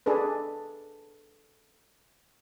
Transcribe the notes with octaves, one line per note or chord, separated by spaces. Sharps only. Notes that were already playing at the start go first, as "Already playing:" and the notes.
D4 G#4 A4 B4